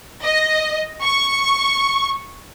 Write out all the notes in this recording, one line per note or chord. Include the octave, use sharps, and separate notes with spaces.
D#5
C#6